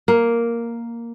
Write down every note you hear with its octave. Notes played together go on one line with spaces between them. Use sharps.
A#3